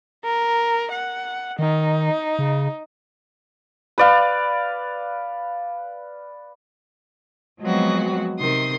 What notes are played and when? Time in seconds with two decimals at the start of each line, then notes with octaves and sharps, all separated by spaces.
0.25 A#4
0.91 F#5
1.59 D#3 D#4
2.39 C#3
3.98 B4 D5 F5
7.61 F3 F#3 G#3 B3 C4 F#4
8.39 C3 D#3 C6 D#6